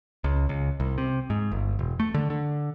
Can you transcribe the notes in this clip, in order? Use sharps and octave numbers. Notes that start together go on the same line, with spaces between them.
C#2
C#2
C2
C3
G#2
G1
E1
A3
D3
D3